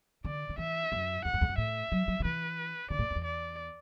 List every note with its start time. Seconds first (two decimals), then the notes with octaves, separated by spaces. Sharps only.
0.25 D3 D5
0.49 D3
0.58 E3 E5
0.92 F#2
1.25 E2 F#5
1.34 F#2
1.41 E2
1.49 F#2
1.57 A2 E5
1.92 F#3
2.08 F#3
2.20 D3
2.24 E3 B4
2.90 D3 D5
2.99 A2
3.11 F#2
3.16 E2
3.24 D5